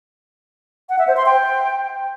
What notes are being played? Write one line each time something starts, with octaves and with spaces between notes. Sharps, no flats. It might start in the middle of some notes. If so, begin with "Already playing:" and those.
F#5
E5
C5
C6
G5